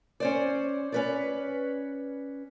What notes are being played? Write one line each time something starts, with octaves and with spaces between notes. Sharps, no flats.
C#4 C5 D5
C#4 B4 D5